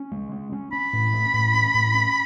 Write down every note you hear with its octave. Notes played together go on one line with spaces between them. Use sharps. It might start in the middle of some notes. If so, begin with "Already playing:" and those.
Already playing: C#4
G#3
C#4
C#4
C#4 B5
A2
C#4
A2
C#4
A2
C#4